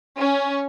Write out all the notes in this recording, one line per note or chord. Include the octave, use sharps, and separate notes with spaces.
C#4